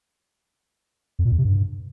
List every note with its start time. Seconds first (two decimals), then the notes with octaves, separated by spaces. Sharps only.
1.19 F2
1.25 A#2
1.32 E2
1.38 C3
1.45 G2